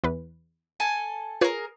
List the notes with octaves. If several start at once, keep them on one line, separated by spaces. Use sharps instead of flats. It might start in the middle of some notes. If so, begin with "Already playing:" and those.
E2 B4
A4 G#5 A5
F4 G#4 A#4 B4 C#5